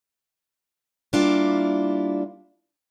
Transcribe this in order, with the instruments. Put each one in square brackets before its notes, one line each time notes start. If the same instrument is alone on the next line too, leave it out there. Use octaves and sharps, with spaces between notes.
[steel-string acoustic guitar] G3 A#3 D4 E4 F4